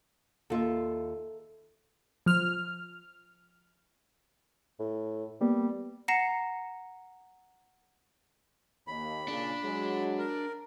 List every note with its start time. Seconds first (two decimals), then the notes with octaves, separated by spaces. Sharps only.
0.50 D#2 F4 A4 E5
2.26 F3 F6
4.80 A2
5.41 G3 A#3 B3
6.08 F#5 A#5 A#6 C7 C#7 E7
8.87 D#2 B5
9.28 A#2 C#3 D4
9.64 F#3 G#3
10.19 A#4